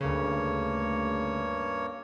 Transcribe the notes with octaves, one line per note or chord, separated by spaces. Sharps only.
D2 G2 C#3 A#3 C#5